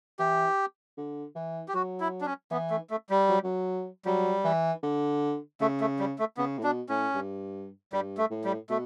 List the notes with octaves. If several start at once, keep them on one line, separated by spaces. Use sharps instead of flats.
E3 G4
D3
E3
G4
F#3 F#4
E4
D4
C#4
E3 B3
A3
A3
G3
F#3
F#3
F#3 G3
E3
D3
C#3 A3
A3
G3
A3
C#3 B3
A2
B2 D4
A2 C#4
G2
G2 G3
A3
A2
G3
B2 A3